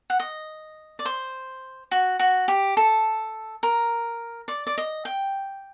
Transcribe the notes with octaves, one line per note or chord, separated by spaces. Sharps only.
F#5
D#5
D5
C5
F#4
F#4
G4
A4
A#4
D5
D5
D#5
G5